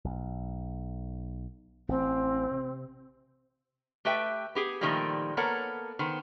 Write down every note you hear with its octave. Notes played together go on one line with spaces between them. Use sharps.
B1
A1 C4
C3
A3 G4 B4 E5 G5
B3 G4 G#4
A#2 D#3 F3 G3 A3 A#3
A#3 B3 A4 A#4 C#5 F#5
D#3 B3 C5